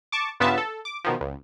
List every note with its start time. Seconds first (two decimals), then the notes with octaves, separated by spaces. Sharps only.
0.12 A5 C#6 D6
0.40 G2 C#3 B3 F4 E5 A5
0.58 A4
0.85 D6
1.04 B2 D#3 F3
1.21 C#2